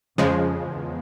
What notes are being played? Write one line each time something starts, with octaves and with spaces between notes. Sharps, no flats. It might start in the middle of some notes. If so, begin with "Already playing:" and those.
F2 C#3 F3 G#3
E2